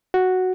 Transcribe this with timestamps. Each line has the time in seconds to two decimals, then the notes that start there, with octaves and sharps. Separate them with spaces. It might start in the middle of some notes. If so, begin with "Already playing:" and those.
0.14 F#4